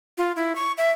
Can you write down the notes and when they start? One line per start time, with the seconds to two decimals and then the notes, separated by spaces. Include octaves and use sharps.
0.18 F4
0.36 E4
0.55 C#6
0.77 E5